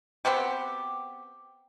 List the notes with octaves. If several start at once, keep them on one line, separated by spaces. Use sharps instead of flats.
B3 C4 F#4 G4